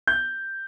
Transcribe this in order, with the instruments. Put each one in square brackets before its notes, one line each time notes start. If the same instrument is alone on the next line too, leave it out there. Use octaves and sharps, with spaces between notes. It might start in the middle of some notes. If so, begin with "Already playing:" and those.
[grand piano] G6